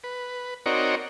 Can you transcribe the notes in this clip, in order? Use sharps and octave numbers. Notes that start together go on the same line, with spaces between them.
B4
C4 D#4 F#4 A#4 C#5 D5